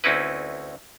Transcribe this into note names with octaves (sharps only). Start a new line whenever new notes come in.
D2 C4 C#4 D#4 E4 B4